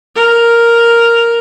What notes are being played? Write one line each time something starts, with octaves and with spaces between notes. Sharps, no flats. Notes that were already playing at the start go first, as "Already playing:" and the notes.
A#4